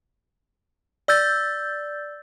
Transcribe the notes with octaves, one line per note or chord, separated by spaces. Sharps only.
D5 E6 G6 A6